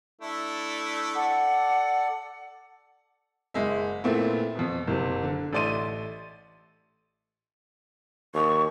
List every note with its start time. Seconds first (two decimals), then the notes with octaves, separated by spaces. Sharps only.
0.21 A3 D4 E4
1.14 A4 D5 F#5
3.54 F#1 G#3 E5
4.04 A#2 A3 B3 C4 E4
4.55 F2 B2
4.87 F#1 C3
5.23 D3
5.53 A1 A3 D5 C6 D#7
8.34 D#2 C#6